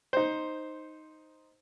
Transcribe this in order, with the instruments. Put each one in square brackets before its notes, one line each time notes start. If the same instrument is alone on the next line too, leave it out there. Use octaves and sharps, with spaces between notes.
[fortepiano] D#4 C5